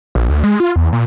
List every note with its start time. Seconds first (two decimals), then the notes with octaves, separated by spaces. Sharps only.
0.15 A#1
0.29 D2
0.44 G#3
0.60 F4
0.76 E2
0.93 A#2